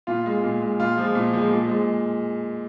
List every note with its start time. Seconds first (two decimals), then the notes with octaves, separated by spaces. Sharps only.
0.07 A#2 F4
0.26 G#3
0.43 A#2
0.62 G#3
0.80 A#2 F4
0.98 F3 G#3
1.15 A#2
1.33 F3 G#3
1.51 A#2
1.69 G#3